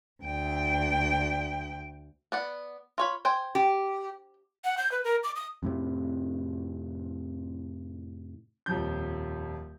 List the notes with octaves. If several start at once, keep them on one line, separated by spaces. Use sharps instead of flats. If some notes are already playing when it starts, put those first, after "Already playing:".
D2 G5
B3 D5 F#5
F4 C#5 B5
C5 G5 G#5
G4
F#5
G6
B4
A#4
D6
D#6
F2 A2 C3
D#1 F2 F3 G6